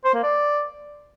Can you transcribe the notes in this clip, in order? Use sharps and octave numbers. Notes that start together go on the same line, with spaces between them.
C5
A#3
D5